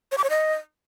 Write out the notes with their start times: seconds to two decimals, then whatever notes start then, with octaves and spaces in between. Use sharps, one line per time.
0.12 C#5
0.18 D6
0.24 C#5
0.30 D#5